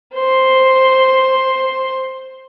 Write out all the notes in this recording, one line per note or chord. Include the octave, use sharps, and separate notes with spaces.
C5 C6